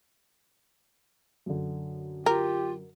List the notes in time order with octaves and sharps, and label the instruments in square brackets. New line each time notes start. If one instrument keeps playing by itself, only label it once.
[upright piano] F#2 D3
[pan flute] F4 [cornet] G4 [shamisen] A#4